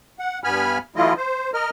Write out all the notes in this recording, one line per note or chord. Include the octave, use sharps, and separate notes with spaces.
F#5
G2 B3 G#5 B5 F6
E3 F#3 A3 E4 F4 D#5
C5
A#4 D#5 F6